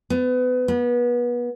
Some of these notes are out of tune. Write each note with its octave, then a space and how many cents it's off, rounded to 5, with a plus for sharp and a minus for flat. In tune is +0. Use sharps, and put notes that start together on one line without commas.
B3 +30
B3 -30